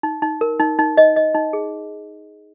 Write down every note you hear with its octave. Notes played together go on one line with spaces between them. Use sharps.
D#4
D#4
A#4
D#4
D#4
D#5
D#5
D#4
G#4